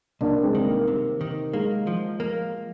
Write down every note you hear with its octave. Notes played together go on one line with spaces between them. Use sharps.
C2 A#3 D4
G#3 C4
D#3
A#3
C3
D#3
G#3 A#3
F3
A#3